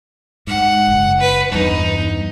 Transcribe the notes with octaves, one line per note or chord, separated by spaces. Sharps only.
G#2 F#5
F#1
B4
E2 G2 D#4